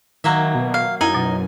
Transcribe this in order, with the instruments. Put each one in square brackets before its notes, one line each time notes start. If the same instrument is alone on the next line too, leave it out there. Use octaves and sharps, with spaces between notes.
[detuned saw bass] D#3 [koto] F#3 A#3 E5
[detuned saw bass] B2
[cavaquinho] F5
[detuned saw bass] F#2 [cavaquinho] D#4 [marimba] E4 [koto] G#5
[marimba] B2 F#3